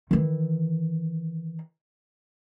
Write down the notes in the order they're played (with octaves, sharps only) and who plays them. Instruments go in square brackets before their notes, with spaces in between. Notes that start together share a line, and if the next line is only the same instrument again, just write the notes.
[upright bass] D#3 E3